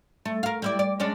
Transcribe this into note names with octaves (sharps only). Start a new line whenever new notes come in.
A3
A#4 F5
G3 E4 D5
D5
G#3 C#4 D4